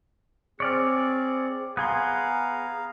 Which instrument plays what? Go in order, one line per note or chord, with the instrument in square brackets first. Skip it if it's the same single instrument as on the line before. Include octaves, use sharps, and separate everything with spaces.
[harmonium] C4 G#4 [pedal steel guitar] C#5 D5 F6
[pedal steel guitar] B3 G#4 C6 [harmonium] F5 A#5